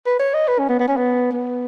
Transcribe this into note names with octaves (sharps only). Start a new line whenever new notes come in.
B4
C#5
D#5
B4
C#4
B3
B3
C#4
B3
B3